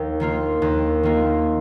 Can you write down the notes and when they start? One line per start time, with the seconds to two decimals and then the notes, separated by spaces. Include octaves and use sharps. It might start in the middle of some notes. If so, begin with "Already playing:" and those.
Already playing: D#2
0.20 D#3 A#3 F4
0.62 D#2
1.03 D#3 A#3 F4